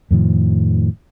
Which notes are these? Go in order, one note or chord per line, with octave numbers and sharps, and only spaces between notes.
F2 A2 D#3 F3